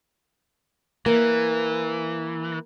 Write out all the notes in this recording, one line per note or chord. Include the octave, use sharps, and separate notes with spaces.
E3 A#3